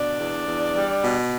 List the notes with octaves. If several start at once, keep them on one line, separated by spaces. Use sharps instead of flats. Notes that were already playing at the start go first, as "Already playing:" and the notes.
Already playing: B2 D4 D5
E2
E2
G3
B2